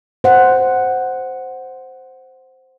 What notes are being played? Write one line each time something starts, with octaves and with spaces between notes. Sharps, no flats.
C5 F#5